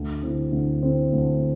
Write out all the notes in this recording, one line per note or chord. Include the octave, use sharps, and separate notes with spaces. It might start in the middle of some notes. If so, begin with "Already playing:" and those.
Already playing: D2
D3 C4 E4
D2
D3 C4 E4
D2